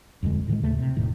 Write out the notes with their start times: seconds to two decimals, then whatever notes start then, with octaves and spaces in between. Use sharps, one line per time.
0.23 D#1 F2 D3 G#3
0.48 A2 D#3 E3 G#3
0.63 D#2 C#3 A3
0.79 C3
0.97 E1 A2 D#3